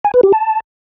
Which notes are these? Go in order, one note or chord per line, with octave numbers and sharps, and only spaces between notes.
G#5
B4
G4
A5